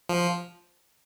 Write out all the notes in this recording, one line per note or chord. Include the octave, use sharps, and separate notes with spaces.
F3